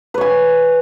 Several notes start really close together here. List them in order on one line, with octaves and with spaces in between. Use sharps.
B4 C#5 G#5